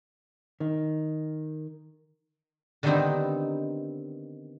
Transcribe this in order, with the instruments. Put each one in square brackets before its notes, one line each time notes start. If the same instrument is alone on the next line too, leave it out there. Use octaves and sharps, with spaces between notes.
[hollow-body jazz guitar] D#3
[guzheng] D3 D#3 G3 B3 C4 D#4